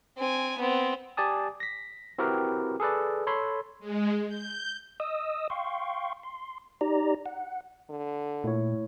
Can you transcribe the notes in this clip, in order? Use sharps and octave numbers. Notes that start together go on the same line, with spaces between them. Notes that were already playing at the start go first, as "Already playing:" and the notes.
C4 G#5
B3 C4
G4 D5 G#5 A5 D#6
A#6 B6
C4 E4 F#4 G4 A#4 B4
G#4 A4 B4 D5
A4 C#5 B5 C6
G#3
G6
D#5 D#6 E6
F5 G5 C6 C#6
C6
D#4 G4 D5 A#5
F#5
D3
A#2 A3 E4 C#5